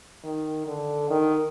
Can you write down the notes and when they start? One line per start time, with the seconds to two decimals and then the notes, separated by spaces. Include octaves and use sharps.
0.24 D#3
0.67 D3
1.10 D#3